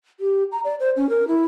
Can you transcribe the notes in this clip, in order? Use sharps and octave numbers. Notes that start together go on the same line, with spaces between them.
G4
A#5
D5
C5
C#4
A#4
E4